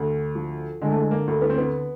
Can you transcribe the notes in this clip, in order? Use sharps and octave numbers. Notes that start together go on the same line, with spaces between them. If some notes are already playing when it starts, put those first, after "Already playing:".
Already playing: D2
F3
D3 G#3
A3
G#3
A#3
D2
B3
C4
B3